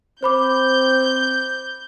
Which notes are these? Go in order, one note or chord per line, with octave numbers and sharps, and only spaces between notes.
C4 C5 B5 D6 G6